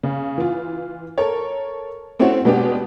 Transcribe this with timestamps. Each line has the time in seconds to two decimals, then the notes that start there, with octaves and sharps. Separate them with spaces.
0.03 C#3
0.38 E3 F4
1.18 A4 A#4 C#5
2.19 A3 C4 C#4 E4 F#4 C#5
2.45 B2 G#3 B3 D4 G4